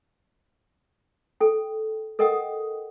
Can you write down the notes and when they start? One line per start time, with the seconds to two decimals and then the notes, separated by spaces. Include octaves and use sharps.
1.41 A4 G5
2.19 A4 A#4 D#5 F#5 G5 D#6